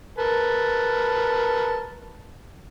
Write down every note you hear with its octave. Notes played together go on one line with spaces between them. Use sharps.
A#4 B4 A5